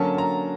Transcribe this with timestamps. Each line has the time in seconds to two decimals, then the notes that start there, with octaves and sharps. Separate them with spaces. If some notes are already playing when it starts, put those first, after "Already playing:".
Already playing: D3 F#3 A#3 C#4 A5
0.18 A#5